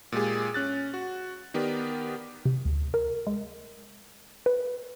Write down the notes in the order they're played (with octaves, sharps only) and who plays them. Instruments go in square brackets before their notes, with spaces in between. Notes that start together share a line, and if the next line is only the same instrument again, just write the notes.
[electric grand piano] A#2 G#3 G4 G#4
C#4 F#6 A6
F#4
D#3 B3 G4 A#4 D5
[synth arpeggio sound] C3
D2
A#4
G#3
B4